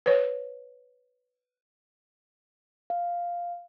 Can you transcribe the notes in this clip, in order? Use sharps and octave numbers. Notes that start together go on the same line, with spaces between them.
B4 C#5
F5